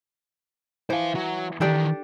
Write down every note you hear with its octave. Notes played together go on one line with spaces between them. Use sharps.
E3 C5 F5
F#3
D#3 E3 D4 G4 A4